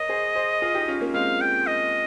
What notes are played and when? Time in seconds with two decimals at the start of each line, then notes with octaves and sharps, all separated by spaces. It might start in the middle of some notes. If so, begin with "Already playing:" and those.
Already playing: A#4 C#5 D#5
0.09 G#4 C5
0.36 G#4 C5
0.62 F4 G#4
0.75 D#4 G4
0.88 C#4 F4
1.00 A#3 C#4
1.14 G#3 C4 F5
1.41 G5
1.67 D#5